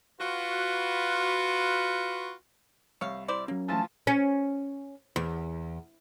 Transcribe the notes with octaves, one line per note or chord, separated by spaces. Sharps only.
F4 F#4 B4
C2 C#5 F5
E4 C5 D5
F#3 A#3 C#4
E3 F3 A3 F4 G#5 A5
C#4
E2